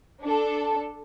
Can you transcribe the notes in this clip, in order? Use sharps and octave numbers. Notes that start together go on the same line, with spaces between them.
D4 A4